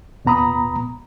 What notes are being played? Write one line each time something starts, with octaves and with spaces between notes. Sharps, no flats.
D#2 A#2 B3 A#5 B5 D#6